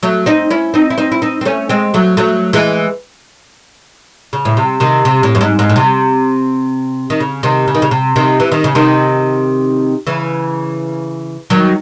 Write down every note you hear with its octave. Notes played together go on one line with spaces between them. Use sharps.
F#3 A3
C4 D#4
C#4 E4
C4 D#4
E4
C4 D#4
E4
C4 D#4
C4
A3 C#4
G#3 C4
F#3 A3
F#3 A3
E3 G#3
C#3
A2
C3
C3 D#3
C3
A2
F#2
G#2
G#2
A2
C3
D#3
C#3
C3 D#3
C#3
D#3
C#3
C3
C3 D#3
E3
D#3
C#3
C3 D#3
C#3 E3
D#3 F#3